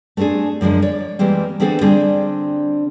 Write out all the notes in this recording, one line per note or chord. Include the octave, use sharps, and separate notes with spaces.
A3 B3 C4 D4 G#4
F#2 D3 F3 G#3
C#5 D5
E3 G3 G#3 A#3 C4
D3 E3 B3 C4 G#4 A4
D3 G3 C4 D4 G#4